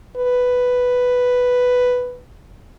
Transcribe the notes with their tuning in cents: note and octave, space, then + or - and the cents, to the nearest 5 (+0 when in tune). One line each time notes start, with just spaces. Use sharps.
B4 +5